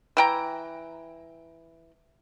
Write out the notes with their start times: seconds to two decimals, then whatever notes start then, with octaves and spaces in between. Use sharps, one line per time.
0.17 E3 G5 A#5